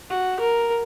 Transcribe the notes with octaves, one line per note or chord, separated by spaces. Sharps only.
F#4
A#4